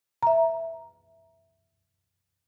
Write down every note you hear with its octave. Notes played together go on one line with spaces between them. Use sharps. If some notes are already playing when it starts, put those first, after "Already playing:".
E5 A#5